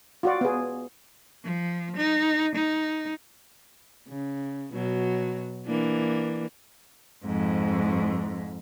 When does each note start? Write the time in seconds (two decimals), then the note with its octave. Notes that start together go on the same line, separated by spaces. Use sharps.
0.23 F4 F#4 D5
0.41 B3 G#4
1.45 F3
1.97 D#4
2.55 D#4
4.08 C#3
4.73 B2 F#3
5.66 E3 A#3 D4
7.25 F2 G#2